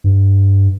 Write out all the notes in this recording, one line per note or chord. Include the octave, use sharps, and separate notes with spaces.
G2